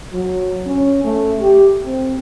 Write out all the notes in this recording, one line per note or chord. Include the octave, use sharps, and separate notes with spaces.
F#3
C#4
A3
G4
C4